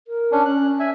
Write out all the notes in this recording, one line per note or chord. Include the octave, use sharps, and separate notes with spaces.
A#4
C#4 D4
C#4 F#6
E5 G#5